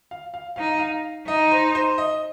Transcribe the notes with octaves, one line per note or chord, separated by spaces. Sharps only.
F5
F5
D#4 F5
F5
D#4 D#5
C5
C5
D#5